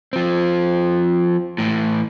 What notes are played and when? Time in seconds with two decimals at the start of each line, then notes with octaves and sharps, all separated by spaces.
0.13 F3 C4
1.58 A2 E3